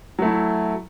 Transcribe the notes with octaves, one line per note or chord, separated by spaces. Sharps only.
F#3 A3 E4